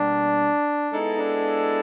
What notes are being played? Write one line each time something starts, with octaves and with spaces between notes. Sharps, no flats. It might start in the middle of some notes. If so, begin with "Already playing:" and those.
Already playing: B2 G3 A#3 D4
G#3 B3 D#4 E4 A4
D4